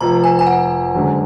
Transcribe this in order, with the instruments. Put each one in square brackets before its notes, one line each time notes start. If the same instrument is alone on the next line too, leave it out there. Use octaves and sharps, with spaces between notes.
[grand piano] F1 F2 F3 [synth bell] A#5
[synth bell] G#5
G#5
F#5
[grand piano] F#1 F#2 D3 G#3